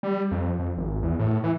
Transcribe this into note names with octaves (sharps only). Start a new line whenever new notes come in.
G3
F2
F2
G#1
E2
A2
E3